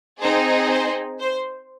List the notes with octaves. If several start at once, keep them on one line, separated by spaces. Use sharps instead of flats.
C4 D#4 G#4 C5
C5
C5